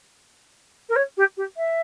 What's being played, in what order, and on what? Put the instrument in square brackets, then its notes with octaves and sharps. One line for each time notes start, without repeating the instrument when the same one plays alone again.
[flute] A#4
C#5
G4
G4
E5